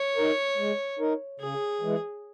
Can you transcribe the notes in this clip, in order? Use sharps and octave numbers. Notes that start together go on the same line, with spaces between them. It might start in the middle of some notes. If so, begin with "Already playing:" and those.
Already playing: C#5
D#4 A#4
G#3
D#4 A#4
C#3 G#4
E3 G#3